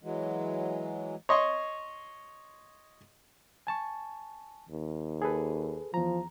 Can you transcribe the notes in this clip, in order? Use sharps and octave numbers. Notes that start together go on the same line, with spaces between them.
E3 F#3 G#3
C#5 D#5 C6 C#6
G#5 A5 C#6
D#2
G#4 A4 B4
E2 F3 A#5